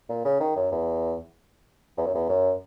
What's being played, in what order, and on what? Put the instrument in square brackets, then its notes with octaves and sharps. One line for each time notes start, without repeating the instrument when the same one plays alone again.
[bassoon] A#2
C#3
D#3
F#2
E2
E2
F#2
E2
F#2